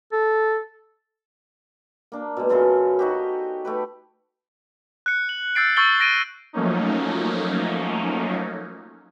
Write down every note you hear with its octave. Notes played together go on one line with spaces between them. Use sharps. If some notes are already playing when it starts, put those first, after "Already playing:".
A4
A#3 D4
B2 G#3
F#2 C#3 F4 A4
D#4 F#4 G4
A3 G4 B4
F#6 C#7
F#7
E6 G6 A6 C7 D7
C#6 E6 G6 A6 F#7 G7
A#6 D7 D#7 G7
F3 F#3 A3 A#3 C#4 D#4